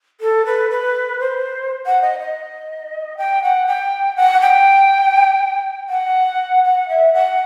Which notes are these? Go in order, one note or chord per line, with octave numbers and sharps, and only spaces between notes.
A4
B4
B4
C5
F#5
D#5
D#5
G5
F#5
G5
F#5
G5
F#5
F#5
E5
F#5